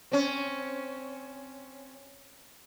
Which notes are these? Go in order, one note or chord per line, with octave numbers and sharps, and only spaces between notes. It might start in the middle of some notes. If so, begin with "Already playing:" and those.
C4 C#4